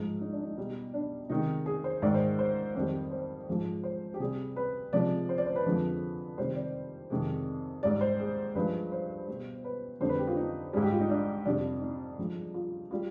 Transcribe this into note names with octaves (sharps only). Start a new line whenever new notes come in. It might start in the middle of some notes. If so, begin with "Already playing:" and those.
Already playing: G#2 F3 G#3 D#4
D#4
D4
D#4
B2 G3
D4
C3 D#3 G#3 D#4
G#4
C5
G#2 D#3 G#3 D5
C5
C5
F2 D#3 G3 C5
C5
G#2 F3 G#3
C5
G4
C3 G3 G#4
B4
C3 F3 G#3 D5
C5
D5
C5
B4
F2 D3 F3 G#3
C3 D#3 G3 C5
D5
F2 C3 D#3 G#3
G#2 G3 D5
C5
G#4
G2 F3 G#3 B4
C5
B2 G3
B4
F2 D3 G3 C5
B4
G4
F4
D#4
G#2 G3 G#4
G4
F4
D#4
D4
F2 C3 G3 D4
D#4
G2 F3 G#3
F4
G3 F4